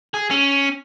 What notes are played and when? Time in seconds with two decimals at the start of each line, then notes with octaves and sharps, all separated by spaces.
0.14 G#4
0.31 C#4